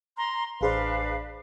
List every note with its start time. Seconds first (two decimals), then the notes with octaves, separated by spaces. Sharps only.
0.17 A#5 C6
0.61 A1 D4 G#4 B4 C5 F5